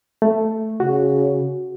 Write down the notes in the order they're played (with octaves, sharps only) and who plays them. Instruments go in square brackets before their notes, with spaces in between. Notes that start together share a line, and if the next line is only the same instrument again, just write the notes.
[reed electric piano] A3
[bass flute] C#3 [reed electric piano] F#4